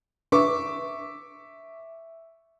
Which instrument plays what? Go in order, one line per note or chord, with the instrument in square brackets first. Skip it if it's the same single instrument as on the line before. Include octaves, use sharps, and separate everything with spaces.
[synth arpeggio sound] D4 B4 [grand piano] E5 C#6 D6